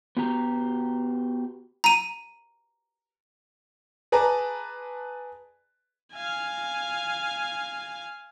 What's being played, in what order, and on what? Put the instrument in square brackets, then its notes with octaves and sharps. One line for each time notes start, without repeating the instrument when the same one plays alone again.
[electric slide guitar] B3 F#4 G4 A#5
[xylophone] A#5 D#7
[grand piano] G#4 B4 D5 A5 A#5
[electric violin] F5 G#5